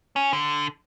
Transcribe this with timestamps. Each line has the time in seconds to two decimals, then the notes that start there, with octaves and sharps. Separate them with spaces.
0.16 C#4
0.33 D3